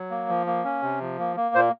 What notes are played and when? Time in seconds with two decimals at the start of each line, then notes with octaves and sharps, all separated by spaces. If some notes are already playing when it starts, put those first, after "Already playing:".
Already playing: F#3
0.10 A#3
0.29 F3
0.47 A#3
0.64 C#4
0.82 C3
1.01 F3
1.19 A#3
1.37 A#3
1.55 A#2 C5